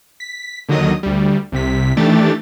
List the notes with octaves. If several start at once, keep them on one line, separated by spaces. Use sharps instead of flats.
B6
D#2 D3 D#3 F#3 D#5 D#6
D2 G3
C2 C3 B6
D#3 E3 A3 D4 G4 A6